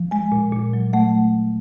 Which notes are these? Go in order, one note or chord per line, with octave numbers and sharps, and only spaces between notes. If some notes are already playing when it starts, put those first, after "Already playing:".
Already playing: F3
G#3 G#5
A#2
A#2
F#3
A3 F#5